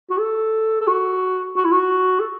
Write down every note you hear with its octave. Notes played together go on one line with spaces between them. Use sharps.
F#4
A4
A4
F#4
F#4
E4
F#4
A4